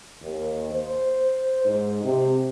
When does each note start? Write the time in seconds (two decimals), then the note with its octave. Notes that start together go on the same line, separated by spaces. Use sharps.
0.23 D#2
0.72 C5
1.65 G#2
2.04 C3